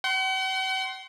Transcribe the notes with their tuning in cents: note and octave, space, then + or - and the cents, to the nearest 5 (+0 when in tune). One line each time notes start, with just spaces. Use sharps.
F#5 +45 C6 +10